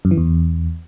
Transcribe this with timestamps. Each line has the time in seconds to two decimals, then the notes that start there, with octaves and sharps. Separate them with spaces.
0.05 F#2
0.11 E3
0.17 E2